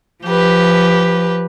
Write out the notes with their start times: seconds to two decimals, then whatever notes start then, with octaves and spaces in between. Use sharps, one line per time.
0.25 F3 G4 B4